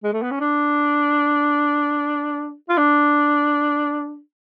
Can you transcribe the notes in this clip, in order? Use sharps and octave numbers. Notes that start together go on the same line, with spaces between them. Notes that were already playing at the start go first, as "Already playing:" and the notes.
G#3
A3
B3
C#4
D4
F4
D4